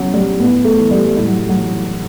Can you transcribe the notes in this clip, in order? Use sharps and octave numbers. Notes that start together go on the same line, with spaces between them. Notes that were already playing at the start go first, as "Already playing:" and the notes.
Already playing: B2 F#3 C#4
G3
A2 B3
A3
E3
G3
A2 G3
F#3
F#3
E3